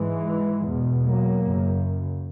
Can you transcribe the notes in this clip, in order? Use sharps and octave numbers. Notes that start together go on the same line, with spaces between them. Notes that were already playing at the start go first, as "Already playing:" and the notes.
Already playing: G#2 E3 G#3
E2 B2
F#3 A#3
F#2 C#3